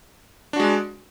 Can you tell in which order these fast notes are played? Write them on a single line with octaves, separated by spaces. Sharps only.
D4 F#4 G#3